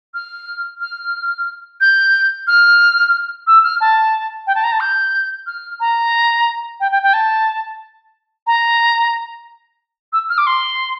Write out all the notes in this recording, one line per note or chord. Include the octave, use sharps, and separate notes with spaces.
F6
F6
G6
F6
E6
F6
A5
G5
A5
A#5
A5
G6
F6
A#5
G5
G5
G5
A5
A#5
E6
F6
D6
C6